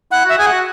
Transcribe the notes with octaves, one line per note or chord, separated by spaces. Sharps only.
E4 F#5
F#4 E5
G#4 G#5
F#5
F#4